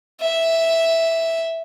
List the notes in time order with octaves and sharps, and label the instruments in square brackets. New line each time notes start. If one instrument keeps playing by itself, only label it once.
[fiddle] E5